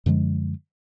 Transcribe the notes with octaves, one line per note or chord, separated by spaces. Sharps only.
F#2 D3 F3 G#3